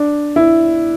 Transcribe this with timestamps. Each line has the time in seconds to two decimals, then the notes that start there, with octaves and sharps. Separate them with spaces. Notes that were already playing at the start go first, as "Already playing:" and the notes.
Already playing: D4
0.36 E4